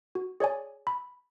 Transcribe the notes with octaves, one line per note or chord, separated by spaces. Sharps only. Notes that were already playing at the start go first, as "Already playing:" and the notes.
F#4
G#4 C#5 D5 G#5
B5